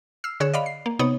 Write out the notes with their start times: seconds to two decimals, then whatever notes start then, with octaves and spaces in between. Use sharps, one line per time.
0.24 E6 F6 C7
0.40 D3 G#4 C#5 F#6 E7
0.54 D5 D#5 F5 B5
0.66 C7
0.86 A#3
0.99 C3 B3 D#4 C#5 D#6